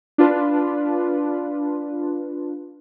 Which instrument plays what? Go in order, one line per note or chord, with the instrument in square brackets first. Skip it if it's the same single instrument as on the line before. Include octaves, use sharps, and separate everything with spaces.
[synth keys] D4 F4 B4